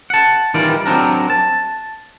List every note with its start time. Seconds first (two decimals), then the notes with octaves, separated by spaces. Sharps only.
0.10 F#5 A5
0.54 D#3 E3 G3 F4 D5
0.86 F#3 C4 D4 A#4
1.30 A5